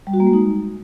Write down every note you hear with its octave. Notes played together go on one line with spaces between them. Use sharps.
G3
F#4
A#3
G#3
D#4